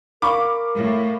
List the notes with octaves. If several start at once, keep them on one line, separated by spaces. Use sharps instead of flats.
A#4 F5 B5 C#6 D6
A2